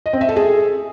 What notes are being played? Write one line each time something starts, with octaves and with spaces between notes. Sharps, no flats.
D#5
C4
E5
A4
G#4